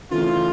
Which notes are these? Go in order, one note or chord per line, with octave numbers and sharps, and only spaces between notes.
C#3 E3 A3 C#4 E4 F4